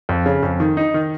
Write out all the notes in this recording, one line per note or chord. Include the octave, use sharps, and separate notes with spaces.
F2
C#3
F2
D#3
D#4
D#3